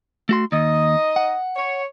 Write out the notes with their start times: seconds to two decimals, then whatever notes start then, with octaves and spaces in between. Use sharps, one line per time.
0.29 A3 F#4 C6
0.52 D#2 D#4 D#5
1.16 F#5
1.56 C#5